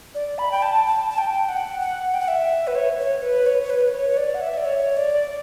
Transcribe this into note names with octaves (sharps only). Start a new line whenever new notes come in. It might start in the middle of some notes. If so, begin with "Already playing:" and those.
D5
B5
G5
A5
A5
A5
G5
F#5
F#5
G5
F#5
E5
B4
C#5
C#5
B4
C#5
C#5
B4
C#5
D5
F#5
E5
D5
C#5
D5